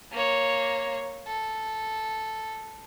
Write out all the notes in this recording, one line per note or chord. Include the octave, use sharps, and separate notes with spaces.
A#3 C#5
A4